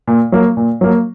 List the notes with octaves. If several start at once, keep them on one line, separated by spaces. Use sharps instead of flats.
A#2
F#3 A#3
A#2
F#3 A#3